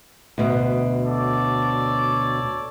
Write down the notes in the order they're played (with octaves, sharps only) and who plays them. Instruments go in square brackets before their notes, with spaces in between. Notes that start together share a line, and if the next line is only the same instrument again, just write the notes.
[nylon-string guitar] D2 B2
[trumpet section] A4 C#5 D5